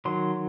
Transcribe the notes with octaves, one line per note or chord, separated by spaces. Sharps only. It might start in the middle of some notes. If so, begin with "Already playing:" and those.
D#3 F#3 C6